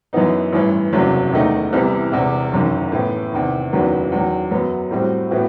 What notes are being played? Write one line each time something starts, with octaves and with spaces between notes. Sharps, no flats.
F#2 E3 B3 D#4
A1 G2 E3
F#1 E2 C3 F#3
E1 E2 D#3 A3 D#4
C2 C3 E3 G3 B3
E1 E2 C3
F#1 F#2 D#3
A2 E3 B3
E2 C3 D#3
F#1 E2 D#3 F#3 B3
E2 D#3 F#3
F#2 F#3 B3
A2 G3 C4 F#4
A2 E3 B3 F#4